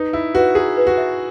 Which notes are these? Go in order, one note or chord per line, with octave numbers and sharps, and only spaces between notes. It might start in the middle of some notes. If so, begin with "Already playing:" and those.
Already playing: D#4 B4
E4 E5
F#4 B4
G#4 A#5
B4
F#4
E5